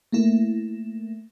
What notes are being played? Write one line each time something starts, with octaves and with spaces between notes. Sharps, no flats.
A3 A#3 E4